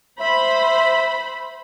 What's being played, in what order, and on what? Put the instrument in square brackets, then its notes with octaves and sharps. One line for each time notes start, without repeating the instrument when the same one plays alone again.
[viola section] C5 B5 [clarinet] E5